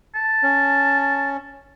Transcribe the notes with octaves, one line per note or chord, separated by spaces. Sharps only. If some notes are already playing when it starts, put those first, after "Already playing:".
A5
C#4